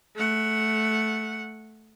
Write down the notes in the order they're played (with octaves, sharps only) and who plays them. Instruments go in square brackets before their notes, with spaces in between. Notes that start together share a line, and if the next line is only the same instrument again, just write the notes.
[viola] A3 F#5